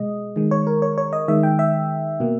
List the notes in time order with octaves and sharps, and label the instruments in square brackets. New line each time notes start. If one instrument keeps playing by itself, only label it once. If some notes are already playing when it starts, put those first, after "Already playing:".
Already playing: [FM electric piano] B2 G#3 D#5
D#3 G#3
C#5
A#4
C#5
C#5
D#5
D#3 G#3 E5
G5
E5
B2 A#3